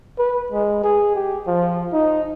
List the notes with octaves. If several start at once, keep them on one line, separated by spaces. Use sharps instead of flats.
B4
G#3
G#4
G4
F3
D#4